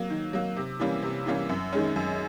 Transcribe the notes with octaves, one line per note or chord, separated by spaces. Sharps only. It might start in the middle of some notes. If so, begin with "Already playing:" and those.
Already playing: F#3 A#3
D#3
F#3 A#3
C3
E3 G3 A#3 C#4
C3
E3 G3 A#3 C#4
F#2
D#3 G#3 C#4
F#2